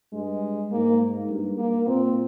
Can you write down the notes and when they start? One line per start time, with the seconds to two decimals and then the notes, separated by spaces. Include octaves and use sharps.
0.13 G2 G#3
0.71 G#2 A#3
1.29 G2
1.58 A#3
1.87 A#2 C4